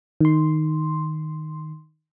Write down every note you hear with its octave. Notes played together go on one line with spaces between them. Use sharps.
D#3 C6